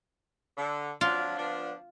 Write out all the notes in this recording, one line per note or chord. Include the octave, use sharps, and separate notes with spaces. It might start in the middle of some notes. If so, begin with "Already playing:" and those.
D3
F3 F#3 D4 F4
F3 B3 D4